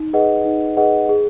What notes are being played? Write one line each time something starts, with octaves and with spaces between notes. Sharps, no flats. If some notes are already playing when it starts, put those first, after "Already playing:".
Already playing: D#4
G#4 B4 D#5 F#5
D#4
G#4 B4 D#5 F#5
G#4